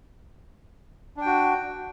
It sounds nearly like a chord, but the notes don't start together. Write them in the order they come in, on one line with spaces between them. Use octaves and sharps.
D4 G5 F#4